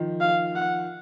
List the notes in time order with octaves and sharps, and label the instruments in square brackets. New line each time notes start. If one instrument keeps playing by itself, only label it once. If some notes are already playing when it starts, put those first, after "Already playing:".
Already playing: [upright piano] D#3 F3
[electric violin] F5
F#5